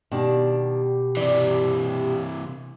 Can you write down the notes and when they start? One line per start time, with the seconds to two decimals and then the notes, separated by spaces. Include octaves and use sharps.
0.11 B2 D#3 D4 G4
1.17 C3 E3 D5